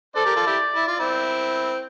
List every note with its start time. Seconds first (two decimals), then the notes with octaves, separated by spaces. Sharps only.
0.16 A4 C5 D5
0.25 G4 A#4
0.36 F4 A4
0.46 E4 G4
0.76 E4
0.88 F4
0.99 C4 E4